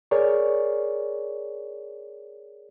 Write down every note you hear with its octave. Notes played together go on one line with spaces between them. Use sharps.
G#4 A#4 C#5 D5